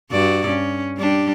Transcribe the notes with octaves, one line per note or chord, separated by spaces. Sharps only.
G2 F#4 D5
C#4
G3 D4 G4